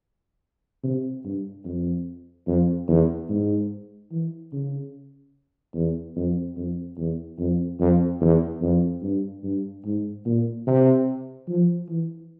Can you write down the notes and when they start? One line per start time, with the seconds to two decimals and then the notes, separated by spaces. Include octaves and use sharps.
0.83 C3
1.24 G2
1.65 F2
2.47 F2
2.88 E2
3.29 G#2
4.11 E3
4.52 C#3
5.75 E2
6.16 F2
6.57 F2
6.97 E2
7.39 F2
7.80 F2
8.21 E2
8.62 F2
9.03 G2
9.43 G2
9.85 G#2
10.25 A#2
10.67 C3
11.48 F3
11.89 E3